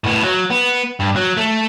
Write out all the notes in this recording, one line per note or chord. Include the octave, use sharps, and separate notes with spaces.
A2 B3
F#3
B3
G2
F#3
A3